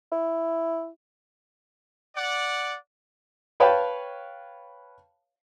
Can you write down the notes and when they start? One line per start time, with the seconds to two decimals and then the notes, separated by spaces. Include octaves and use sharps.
0.12 E4
2.15 D5 F#5
3.60 B4 C#5 F5 G5 A5 B5